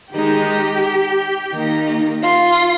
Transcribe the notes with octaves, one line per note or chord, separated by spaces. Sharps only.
D#3 G#3 D#4 G4
D#3 A#3 D#4
F4